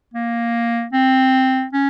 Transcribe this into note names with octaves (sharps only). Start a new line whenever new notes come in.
A#3
C4
C#4